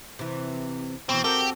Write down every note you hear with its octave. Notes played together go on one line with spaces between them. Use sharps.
C3 E3
B2 E3 C4
C4 F#4 G4 A4 A#4